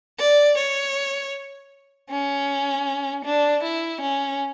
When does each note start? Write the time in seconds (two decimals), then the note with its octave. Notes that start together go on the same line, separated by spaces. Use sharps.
0.20 D5
0.58 C#5
2.10 C#4
3.25 D4
3.64 E4
4.02 C#4